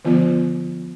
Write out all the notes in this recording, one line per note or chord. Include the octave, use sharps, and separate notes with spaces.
D3 F3 B3 F4